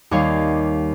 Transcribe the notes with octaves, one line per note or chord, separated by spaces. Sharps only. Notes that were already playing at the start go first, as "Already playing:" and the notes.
D#2 G3 C#5 F5